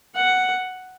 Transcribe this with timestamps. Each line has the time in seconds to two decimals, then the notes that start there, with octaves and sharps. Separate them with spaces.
0.16 F#5